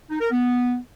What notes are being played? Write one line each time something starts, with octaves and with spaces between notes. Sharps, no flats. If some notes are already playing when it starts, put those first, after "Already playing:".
D#4
A#4
B3